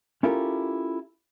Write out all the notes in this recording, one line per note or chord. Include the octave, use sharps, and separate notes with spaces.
C#4 E4 F4 G4 A4 A#4